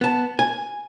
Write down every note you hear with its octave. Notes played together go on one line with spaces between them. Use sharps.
B3 A5
G#5